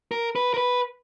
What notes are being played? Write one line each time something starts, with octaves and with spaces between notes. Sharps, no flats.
A#4
B4
A#4
B4